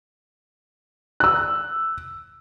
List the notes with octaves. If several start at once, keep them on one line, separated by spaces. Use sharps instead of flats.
E6 F#6